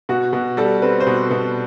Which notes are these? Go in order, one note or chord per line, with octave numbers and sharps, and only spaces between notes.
B2 F#4
B2
G3 A4
C4 B4
C5
B2 B4
B2